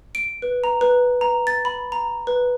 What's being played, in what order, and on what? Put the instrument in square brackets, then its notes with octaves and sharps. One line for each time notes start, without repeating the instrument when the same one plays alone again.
[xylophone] D7
B4
A#5
B4
A#5
A6
B5
A#5
B4